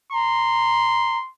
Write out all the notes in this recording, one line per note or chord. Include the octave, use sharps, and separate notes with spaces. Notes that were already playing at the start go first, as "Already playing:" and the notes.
A#5 C6